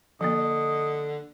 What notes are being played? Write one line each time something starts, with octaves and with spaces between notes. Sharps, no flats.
D3 F3 A#3 D#5